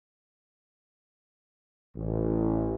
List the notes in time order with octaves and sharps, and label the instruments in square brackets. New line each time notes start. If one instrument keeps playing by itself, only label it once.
[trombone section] A1